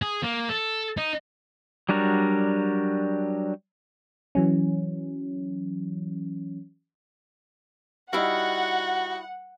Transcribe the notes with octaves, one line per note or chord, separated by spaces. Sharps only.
G#4
A#3
A4
D#4
F#3 G3 D4 F#4 A#4
E3 F#3 C#4
G3 D#4 E4 F#4 F5 F#5